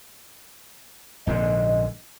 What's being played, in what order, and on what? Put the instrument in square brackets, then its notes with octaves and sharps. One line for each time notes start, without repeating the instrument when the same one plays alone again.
[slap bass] A#1 G#2 D3 [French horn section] D#5